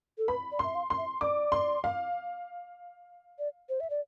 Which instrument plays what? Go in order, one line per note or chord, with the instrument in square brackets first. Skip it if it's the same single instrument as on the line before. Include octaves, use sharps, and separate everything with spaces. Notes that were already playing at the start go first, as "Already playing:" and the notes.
[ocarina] A4
[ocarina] B4 [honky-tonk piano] B5
[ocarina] D5
[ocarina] E5 [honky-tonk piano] C6
[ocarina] F5
[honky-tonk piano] C6
[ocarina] E5
[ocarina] D5 [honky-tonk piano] D6
[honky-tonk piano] C6
F5
[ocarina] D5
C5
E5
D5